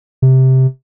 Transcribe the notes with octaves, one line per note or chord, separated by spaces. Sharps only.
C3